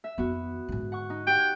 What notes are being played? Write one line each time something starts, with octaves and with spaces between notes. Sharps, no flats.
E5
F2 D#3 B3 F#4
G#2 D3
F#5 C#6
D#4
G4 F#5 G5